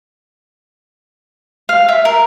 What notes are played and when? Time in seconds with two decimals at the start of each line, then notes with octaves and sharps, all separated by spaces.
1.69 F5
1.89 E5
2.05 A#4